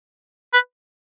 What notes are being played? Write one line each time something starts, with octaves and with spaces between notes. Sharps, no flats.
B4